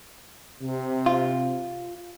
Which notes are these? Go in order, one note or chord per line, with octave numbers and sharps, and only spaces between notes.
C3
F4